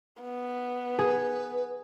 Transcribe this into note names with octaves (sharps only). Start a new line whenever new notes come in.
B3
G#4 B4